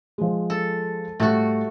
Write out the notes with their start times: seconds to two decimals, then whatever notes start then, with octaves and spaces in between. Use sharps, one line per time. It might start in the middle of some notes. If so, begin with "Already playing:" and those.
0.18 F3 G#3
0.50 A4
1.20 A2 G3 A3 F#4 A6